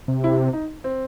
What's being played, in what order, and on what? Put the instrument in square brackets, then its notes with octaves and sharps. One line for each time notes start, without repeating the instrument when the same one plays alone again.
[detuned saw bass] C3
[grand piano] E4
D#4
C4